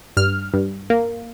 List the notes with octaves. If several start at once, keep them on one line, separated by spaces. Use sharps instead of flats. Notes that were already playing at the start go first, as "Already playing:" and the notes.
G2 F6
G2
A#3